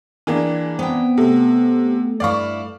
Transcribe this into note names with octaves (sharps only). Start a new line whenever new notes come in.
E3 A#3 D4 G#4 G5 G#5
B3 C4 G5
C3 A3 A4
G2 E4 D5 F5 C#6